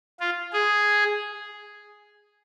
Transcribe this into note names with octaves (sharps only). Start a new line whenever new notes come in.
F4
G#4